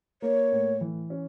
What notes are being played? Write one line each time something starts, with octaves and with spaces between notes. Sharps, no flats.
A#3 C#5
A2
E3
C#4